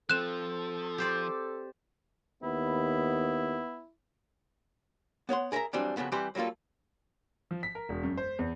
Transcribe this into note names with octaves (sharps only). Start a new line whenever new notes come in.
F3 C4 A4 F#6 E7
G4 C5 D5
D#2 B3 E4
B3 C#5 F#5 C6
G#4 A#4 C5 E5 A#5
E3 F#3 G3 C4 D4
F2 A#2 C#3 B3 F#4
E3 G3 C4 G4 B4 C5
F#3 G3 A#3 F4 A4
F3
B6
A#4
E1
F#2
C5
E2